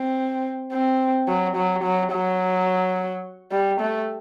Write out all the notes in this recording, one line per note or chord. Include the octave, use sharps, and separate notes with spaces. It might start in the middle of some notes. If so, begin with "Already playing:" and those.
Already playing: C4
C4
F#3
F#3
F#3
F#3
G3
A3